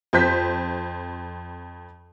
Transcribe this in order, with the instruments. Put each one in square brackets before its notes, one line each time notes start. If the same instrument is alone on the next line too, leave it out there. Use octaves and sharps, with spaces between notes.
[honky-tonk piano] F2 C5 G6 B6